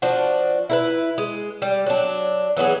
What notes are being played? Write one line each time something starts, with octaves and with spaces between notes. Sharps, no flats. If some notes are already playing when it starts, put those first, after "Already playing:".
F3 D4 F#4
E4 A#4 B4
G#3
G3
F#3 D4
E3 F#3 B3 G#4